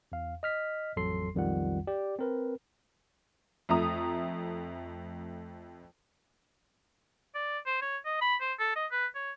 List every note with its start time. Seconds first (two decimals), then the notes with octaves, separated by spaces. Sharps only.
0.12 E2 F5
0.43 D#5 F6 B6
0.96 A1 F2 F#3 A4 C6 C7
1.35 B1 F2 D#3 G3 F4 F#5
1.87 G4 D5
2.19 C4 A#4 B4
3.69 F2 A3 A#5 D#6
7.35 D5
7.66 C5
7.82 C#5
8.05 D#5
8.21 B5
8.41 C5
8.59 A4
8.76 D#5
8.91 B4
9.15 C#5